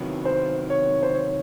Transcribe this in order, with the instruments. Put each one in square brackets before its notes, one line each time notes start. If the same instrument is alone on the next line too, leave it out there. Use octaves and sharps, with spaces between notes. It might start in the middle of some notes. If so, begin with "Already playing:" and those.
Already playing: [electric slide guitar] C3 D#3 F#3 B3 E4
[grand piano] C5
C#5
C5
C#5